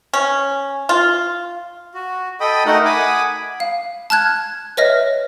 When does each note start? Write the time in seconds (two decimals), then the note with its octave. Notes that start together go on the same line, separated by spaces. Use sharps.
0.13 C#4
0.89 F4
1.94 F#4
2.40 A4 D#5 G5 B5 D#6
2.66 A3 D#4 F#4 A#4 D#5 F#5
2.85 F#5 G#5 B5 D6 D#6
3.60 F5
4.10 A5 F6 F#6 G#6
4.77 B4 C#5 D#5 E5 F6 A#6